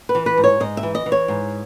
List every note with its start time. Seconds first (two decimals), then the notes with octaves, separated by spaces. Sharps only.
0.09 B4
0.15 E3
0.26 B4
0.37 G#2
0.44 C#5
0.60 G#2 D#5
0.77 E5
0.83 E3
0.95 D#5
1.06 E3
1.12 C#5
1.28 G#2